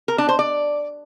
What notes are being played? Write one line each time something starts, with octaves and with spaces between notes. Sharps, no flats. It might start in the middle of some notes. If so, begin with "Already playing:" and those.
A#4
D4
C5
D5